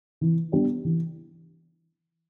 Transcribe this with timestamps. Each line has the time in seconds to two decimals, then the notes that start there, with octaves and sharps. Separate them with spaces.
0.21 E3
0.52 G3 B3 D4 G4
0.85 E3